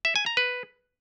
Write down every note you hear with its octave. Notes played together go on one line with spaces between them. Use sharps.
E5
G#5
A#5
B4